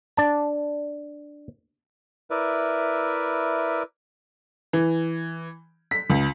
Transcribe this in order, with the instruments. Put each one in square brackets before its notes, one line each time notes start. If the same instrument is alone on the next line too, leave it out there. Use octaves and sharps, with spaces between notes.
[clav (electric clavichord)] D4 A5
[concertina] E4 A#4 B4 D5 E5
[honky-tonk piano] E3
B6
C#2